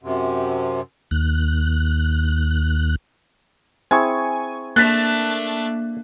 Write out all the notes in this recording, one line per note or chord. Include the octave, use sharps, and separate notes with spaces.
F#2 C3
D#2 F#6
C4 E4 G#4 G#5 C#6 G#6
A3 A#3 D4 F#6 A6 B6